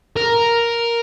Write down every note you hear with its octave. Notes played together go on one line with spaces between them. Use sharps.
A#4